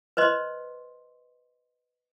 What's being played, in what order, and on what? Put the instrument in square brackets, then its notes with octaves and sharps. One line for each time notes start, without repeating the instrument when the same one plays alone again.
[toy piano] B4 C5 D#5 C6